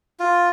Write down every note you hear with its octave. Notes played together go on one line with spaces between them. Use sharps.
F4